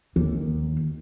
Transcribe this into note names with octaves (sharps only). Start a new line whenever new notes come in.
D#2